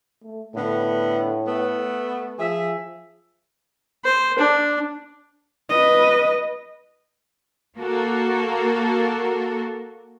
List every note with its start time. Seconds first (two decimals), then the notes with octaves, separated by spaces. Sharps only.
0.24 A3
0.55 A2 D3 B3
1.46 A3 B3
2.39 F3 G#4 E5
4.04 C5
4.38 D4
5.70 B4 D#5
7.78 A#3 F#4 A4 A#4